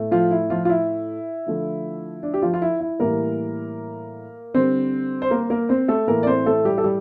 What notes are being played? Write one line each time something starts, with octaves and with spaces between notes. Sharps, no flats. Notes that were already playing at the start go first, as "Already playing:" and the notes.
Already playing: A2 A3
F3 F4
E4
F3 F4
F4
E4
D3 F3 A3
D4
G4
F3 F4
F4
E4
E4
A2 E3 G3 A#3 A#4
D3 G3 C4 C5
C5
A#3 A#4
A#3 A#4
C4 C5
A3 A4
A2 E3 A3 A#3 A#4
D5
C4 C5
A3 A4
G3 G4
A4
G3 G4